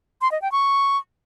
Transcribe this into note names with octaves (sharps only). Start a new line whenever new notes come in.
C6
D#5
G5
C#6